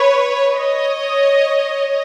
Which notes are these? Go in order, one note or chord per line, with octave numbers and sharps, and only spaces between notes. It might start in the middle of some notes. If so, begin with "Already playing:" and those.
Already playing: B4 C#5
C#5 D#5